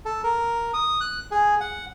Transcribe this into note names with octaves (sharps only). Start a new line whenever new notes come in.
A4
A#4
D#6
F#6
G#4
F#5